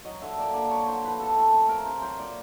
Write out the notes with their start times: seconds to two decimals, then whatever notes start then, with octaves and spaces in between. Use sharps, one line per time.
0.05 F#3 D#5
0.22 D3 E5
0.38 A#3 D5
0.54 D3 D5
0.71 F#3 C#5
0.87 D3 C5
1.04 F3 B4
1.20 C3 A4
1.36 A3 A4
1.54 C3
1.69 F3 A#4
1.85 C3 C5
2.02 F#3 C5
2.18 A#2 D5